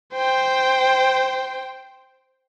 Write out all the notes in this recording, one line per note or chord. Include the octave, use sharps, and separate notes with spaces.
C5 G5